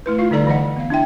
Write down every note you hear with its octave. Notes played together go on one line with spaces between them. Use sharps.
A3 E4 B4
F4 F5
D3 G3 D#4 A4 D5 A#5
E3 D5 D#5 F#5
B3 F5
D4 E4 E5 G5